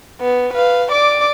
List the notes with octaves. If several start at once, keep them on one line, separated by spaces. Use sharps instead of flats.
B3
B4 F5
D5 D6